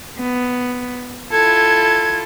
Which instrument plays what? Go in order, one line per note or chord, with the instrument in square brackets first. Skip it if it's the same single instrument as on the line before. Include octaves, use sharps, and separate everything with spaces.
[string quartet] B3
[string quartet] E4 F4 A4 [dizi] G#6